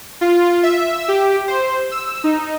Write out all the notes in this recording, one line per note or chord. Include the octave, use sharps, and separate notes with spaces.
F4
E5
G4
C5
E6
D#4